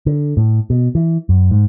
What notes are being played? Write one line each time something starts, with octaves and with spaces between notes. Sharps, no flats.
D3
A2
B2
E3
F#2
G#2